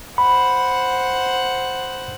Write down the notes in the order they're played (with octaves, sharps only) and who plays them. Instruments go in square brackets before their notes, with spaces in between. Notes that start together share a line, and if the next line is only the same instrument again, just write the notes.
[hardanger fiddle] C5 F#5 [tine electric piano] B5